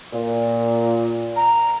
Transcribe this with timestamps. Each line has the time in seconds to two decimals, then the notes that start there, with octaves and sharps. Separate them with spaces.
0.13 A#2
1.36 A#5